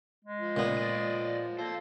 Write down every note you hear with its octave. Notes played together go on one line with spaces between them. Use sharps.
G#3
F3
A#2 C#3 B3
D5 D#5
A#3 F4 A4 C5